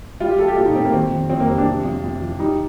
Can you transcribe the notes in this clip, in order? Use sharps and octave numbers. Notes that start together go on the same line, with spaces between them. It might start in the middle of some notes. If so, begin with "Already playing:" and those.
G3 F4
G4
G3 A4
G4
A#2 F4
D#4
A#2 C4
A#3
D#3 C4
F2
F2 C4
A#3
G3 C4
D4
C3
F2
F2
F3
G3 D#4